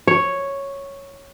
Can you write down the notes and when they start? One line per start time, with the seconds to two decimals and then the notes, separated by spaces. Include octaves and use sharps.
0.07 C#5